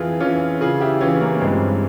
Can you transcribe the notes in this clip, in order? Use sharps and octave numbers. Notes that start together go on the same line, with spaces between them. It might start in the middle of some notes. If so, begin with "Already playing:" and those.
Already playing: F2 E3 F4 G#4
E3 C#4 F4
C#3 F4 G#4
E4 G4
E3 C#4 F4
A#3 C#4
G2 G#3 C4